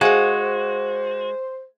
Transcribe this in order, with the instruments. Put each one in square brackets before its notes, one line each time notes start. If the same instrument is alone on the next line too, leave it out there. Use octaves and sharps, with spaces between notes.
[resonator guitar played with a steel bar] G#3 [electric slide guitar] F#4 [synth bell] G#4 F5 [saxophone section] C5